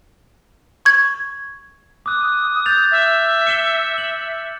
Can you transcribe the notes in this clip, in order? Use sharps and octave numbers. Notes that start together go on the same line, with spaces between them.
C#6 G#6
D6 D#6 F#6
G6 A6 F7
E5
C#7 E7 G7
F#7